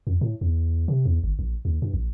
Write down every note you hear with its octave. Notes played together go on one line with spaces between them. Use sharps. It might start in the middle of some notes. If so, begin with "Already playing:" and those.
F2
A2
E2
C3
E2
G1
A#1
D#2
G2
A#1